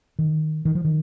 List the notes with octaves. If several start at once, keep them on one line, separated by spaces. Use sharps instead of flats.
D#3
D#3
F3
D#3